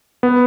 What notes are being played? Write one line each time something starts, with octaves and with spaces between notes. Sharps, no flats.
B3